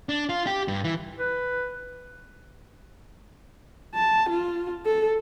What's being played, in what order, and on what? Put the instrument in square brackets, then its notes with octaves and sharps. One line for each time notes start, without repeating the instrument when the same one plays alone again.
[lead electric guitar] D4
F4
G4
G2
E3
[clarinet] B4
[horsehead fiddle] A5
F4
A4